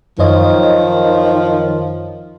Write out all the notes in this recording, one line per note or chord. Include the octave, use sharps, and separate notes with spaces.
F#2 D#3 F3 C#5 D#5